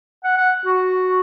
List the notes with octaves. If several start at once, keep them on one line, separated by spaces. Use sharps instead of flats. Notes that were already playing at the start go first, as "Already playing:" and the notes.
F#5
F#5
F#4